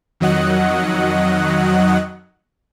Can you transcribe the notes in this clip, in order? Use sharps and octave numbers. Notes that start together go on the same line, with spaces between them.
F2 D#3 F#3 D#5 F#5 F#6